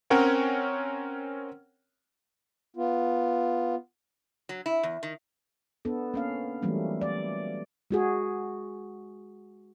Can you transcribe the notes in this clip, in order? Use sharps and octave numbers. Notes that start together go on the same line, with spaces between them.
C4 C#4 A#4 C#5 F#5 G5
B3 F4
F#3
E4
E2
D#3
B3 D4 A4
A#3 C#4 F5
E3 F#3 G3 A3 A#3 C#4
D5
G#3 F#4 G#4